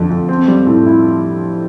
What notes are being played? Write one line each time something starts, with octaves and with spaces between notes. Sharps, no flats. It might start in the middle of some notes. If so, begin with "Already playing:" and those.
Already playing: F2 D3 A3
F2
C4
G3
A2
E4